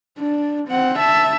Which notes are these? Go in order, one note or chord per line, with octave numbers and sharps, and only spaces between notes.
D4
C4 F#5
E5 A5